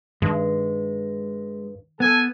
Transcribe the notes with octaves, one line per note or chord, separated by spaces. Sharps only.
G2 D#3 G#3
B3 A4 G#5